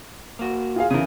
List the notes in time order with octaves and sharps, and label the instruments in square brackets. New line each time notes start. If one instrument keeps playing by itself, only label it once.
[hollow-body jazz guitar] A#3 F#4
[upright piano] F4 G#4 F5
[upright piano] C#3 E3 [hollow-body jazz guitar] G#4 A#4